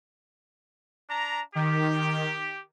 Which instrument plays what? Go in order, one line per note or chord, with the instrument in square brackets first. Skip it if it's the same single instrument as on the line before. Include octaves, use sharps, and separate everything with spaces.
[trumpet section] D4 A#5
[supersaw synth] D#3 [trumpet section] G4